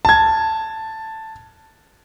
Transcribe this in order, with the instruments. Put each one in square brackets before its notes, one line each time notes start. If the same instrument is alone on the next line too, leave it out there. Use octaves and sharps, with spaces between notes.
[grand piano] A5 G#6